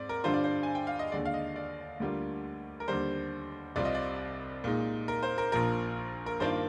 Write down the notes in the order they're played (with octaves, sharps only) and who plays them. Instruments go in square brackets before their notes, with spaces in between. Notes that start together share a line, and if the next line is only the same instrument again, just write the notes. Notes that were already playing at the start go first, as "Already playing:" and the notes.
Already playing: [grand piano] G#2 C4 D5
A#4
G2 D3 G3 D4 F4 C5
D5
C5
G#5
G5
F5
D#5
D#2 D3 G#3 D5
F5
D#5
D5
D2 D3 G3 A#3 F4
A#4
D#2 D3 G3 C5
C2 C3 G3 C4 F4 D5
D#5
D5
A#2 G#3 D#4
A#4
C5
A#4
A#1 A#2 F3 A#4
A#4
G2 D#3 A#3 D4 F4 C5